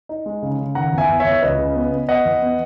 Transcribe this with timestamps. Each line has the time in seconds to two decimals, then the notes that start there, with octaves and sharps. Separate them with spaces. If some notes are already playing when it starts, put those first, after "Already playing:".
0.09 D#4
0.26 G#3
0.42 C#3
0.58 C#3
0.75 D#3 F#5 A#5
0.93 E2
0.98 E5 G#5
1.09 E2
1.20 C#5 E5
1.25 E2
1.42 C#2 B4 D#5
1.59 C#3
1.75 B3
1.92 B3
2.09 B3 D#5 F#5
2.25 E2
2.42 B3